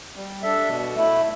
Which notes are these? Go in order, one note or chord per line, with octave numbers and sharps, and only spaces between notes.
G3
D4 A4 E5
B2
A3 E4